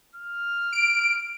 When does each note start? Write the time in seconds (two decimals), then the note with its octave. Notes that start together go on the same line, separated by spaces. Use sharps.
0.16 F6
0.72 D7